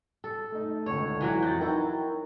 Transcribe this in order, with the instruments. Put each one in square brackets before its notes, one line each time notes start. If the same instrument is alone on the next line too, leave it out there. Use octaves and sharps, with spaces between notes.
[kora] A4
[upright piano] A3 D#4
[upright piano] C#2 D3 A4 [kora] C#5
[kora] E3 F#3 F#4
[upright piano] F2 [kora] F#4 [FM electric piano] G6 A6
[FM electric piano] D#4 A#4 G5 [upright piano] E4 D#5 E6